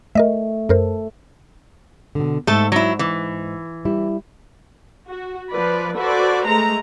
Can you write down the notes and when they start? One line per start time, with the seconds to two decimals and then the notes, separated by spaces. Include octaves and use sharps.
0.15 A3 A#4 D#5 E5
0.69 F#2 A4 A#4 C5
2.15 B2 D3
2.47 G#2 A3 A4
2.72 F#3 E4
2.99 E3
3.85 G3 E4
5.10 F#4
5.51 F3 B4 D5
5.96 F#4 A4 B4 C5 D5
6.47 G#3 A3 A#5